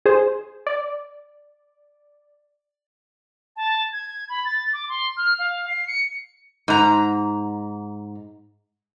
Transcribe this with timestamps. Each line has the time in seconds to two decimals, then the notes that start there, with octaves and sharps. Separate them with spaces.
0.06 G#4 C5
0.67 D5
3.56 A5
3.93 G#6
4.29 B5
4.45 A6
4.73 D6
4.89 C6
5.17 F6
5.39 F5
5.68 C7
5.87 C#7
6.68 G#2 A#5